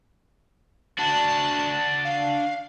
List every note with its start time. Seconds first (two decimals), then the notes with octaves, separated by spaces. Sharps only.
0.99 D4 F#4 A5
2.04 F5